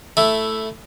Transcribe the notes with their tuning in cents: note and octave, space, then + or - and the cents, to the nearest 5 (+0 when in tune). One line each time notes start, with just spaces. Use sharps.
A3 +0 E4 +0